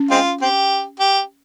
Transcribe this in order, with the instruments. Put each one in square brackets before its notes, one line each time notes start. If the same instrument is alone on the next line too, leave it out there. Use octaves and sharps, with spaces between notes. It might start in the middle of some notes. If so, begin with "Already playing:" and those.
Already playing: [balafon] C#4
[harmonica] G#3 C4 F4
C4 G4
G4